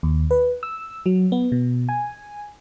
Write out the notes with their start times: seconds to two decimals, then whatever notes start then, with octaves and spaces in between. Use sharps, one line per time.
0.03 D#2
0.31 B4
0.63 E6
1.06 F#3
1.32 B3
1.52 B2
1.89 G#5